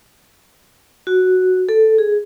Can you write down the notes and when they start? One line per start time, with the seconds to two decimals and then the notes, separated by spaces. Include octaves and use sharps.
1.07 F#4
1.69 A4
1.98 G#4